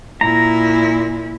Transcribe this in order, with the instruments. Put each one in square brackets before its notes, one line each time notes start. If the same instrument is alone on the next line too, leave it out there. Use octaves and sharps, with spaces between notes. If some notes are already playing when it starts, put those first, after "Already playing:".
[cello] A#2 E4 [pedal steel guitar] A#5